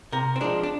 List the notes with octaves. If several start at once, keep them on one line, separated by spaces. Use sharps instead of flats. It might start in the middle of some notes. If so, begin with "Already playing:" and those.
C3 A#4
C4
F3 G#3 D4
D4